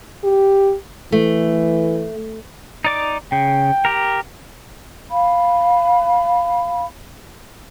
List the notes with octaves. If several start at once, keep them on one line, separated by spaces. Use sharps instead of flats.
G4
E3 A3
D#4 D5 D6
C#3 G5
G4 A#4
F5 B5